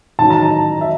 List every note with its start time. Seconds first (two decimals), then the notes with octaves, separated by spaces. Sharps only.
0.19 A1 G#2 D#3 F#3 A5
0.30 A#5
0.42 A5
0.81 E5